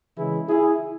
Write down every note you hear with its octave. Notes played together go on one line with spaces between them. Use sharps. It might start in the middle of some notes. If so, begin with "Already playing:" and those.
C#3 E3 G#3 E4 G#4
E4 G#4